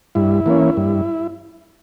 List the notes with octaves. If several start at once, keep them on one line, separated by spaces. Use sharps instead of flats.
G2 E4
E3 A#3 C#4
G2